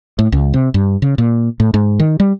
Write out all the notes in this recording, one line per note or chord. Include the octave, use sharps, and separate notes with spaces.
A2
C#2
C3
G2
C#3
A#2
A2
G#2
D#3
G3